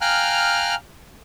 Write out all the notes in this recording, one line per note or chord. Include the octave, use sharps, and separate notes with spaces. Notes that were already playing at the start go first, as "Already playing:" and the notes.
F5 G5 G#5 A#5 F6 F#6